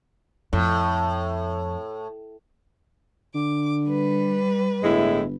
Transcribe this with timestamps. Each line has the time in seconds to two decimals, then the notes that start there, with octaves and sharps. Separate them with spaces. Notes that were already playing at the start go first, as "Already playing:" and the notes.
0.53 F2 A2
3.34 D3 D6
3.85 G3 B4
4.84 G1 A2 G#3 E4